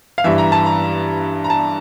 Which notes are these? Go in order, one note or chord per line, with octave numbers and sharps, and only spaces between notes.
F5
G2 E3 E5
A#5
A5
A#5
A#5
A5